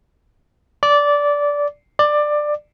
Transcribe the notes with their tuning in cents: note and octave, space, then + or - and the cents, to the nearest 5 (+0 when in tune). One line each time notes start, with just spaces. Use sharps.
D5 -15
D5 +15